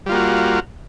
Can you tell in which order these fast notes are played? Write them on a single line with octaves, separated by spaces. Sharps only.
G3 F4 A#3 F#4